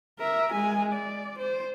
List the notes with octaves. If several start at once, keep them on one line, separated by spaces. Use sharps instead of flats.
A#4 E5
G#3 G#5
D5
C5